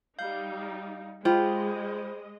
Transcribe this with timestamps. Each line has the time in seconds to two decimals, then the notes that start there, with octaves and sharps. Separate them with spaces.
0.19 G3 D#4 F5 G6
1.25 G#3 F4 G4 C5 D#5 B5